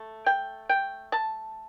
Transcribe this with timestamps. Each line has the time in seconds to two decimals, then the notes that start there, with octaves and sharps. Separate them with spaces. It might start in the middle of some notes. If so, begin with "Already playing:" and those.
Already playing: A3
0.26 G5
0.69 G5
1.12 A5